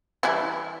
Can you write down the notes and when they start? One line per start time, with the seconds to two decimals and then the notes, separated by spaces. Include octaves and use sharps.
0.23 E3 G3 E4